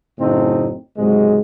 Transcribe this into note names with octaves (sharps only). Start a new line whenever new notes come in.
F#2 A2 C#3 A3 C4 D#4
C#2 G#2 C3 F#3 G#3